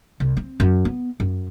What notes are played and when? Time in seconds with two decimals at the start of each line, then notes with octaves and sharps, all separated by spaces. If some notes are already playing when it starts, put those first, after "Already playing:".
0.20 C2
0.37 C4
0.60 F#2
0.85 B3
1.20 F#2